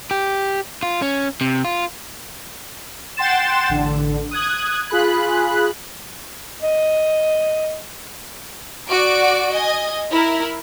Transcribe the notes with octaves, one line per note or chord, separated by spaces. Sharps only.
G4
F4
C#4
C3
F4
F#5 G5 C6 A6 E7
A1 D3
D#6 F#6 G#6
F4 G#4 B5 F#6
D#5
F#4 D5 D6 D7
D#5 G#5
E4 A#4